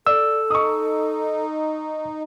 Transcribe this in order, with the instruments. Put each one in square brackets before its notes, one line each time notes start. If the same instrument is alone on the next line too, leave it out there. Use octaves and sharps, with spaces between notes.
[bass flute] A4 [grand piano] D5 [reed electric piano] E6
[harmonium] D#4 [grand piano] C#6 D#6